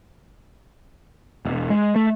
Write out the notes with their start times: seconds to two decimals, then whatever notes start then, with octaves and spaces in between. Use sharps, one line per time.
1.45 E1
1.70 G#3
1.96 A3